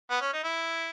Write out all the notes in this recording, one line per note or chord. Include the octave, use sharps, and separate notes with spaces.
B3
C#4
D#4
E4